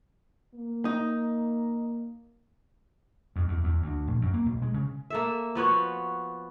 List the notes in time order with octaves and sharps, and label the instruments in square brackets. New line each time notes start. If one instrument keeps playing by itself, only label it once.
[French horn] A#3
[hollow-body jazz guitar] D#4
[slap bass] F2
E2
E2
D2
A#1
F#2
A#3
B1
G#3
C#3
[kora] A#3 A4 E5
F3 B3 F#4 C#5